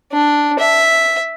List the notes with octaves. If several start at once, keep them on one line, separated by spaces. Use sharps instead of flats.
D4
E5